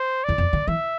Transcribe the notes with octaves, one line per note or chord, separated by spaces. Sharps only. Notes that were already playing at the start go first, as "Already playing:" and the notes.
Already playing: C5
E2 D5
F2
D3
E3 E5